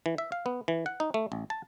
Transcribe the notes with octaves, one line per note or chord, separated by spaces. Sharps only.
E3
E5
F5
B3
E3
F#5
D#4
A3
A1
A5